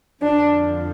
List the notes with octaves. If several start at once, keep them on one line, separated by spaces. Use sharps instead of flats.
F2 D3 F3 D4